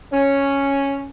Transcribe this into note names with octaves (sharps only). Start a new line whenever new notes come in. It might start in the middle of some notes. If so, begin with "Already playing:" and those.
C#4